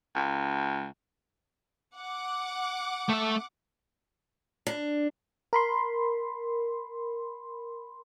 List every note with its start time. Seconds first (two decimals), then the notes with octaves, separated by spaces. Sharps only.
0.15 C#2
1.97 F#5 D6
3.09 A3 E5
4.67 D4
5.53 A#4 B5 C6